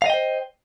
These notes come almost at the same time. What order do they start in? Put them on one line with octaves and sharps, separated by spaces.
F5 D#5 G5 C5